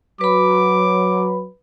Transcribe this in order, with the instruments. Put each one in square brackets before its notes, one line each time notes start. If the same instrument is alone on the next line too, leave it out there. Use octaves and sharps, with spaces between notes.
[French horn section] F#3 [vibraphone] B4 B5 [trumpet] D6